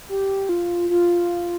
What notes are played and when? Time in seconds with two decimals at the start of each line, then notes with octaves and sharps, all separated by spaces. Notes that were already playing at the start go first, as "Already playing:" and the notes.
0.09 G4
0.49 F4
0.90 F4